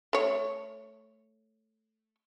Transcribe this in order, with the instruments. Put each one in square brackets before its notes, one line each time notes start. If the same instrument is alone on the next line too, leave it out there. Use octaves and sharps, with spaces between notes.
[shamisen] A3 C#5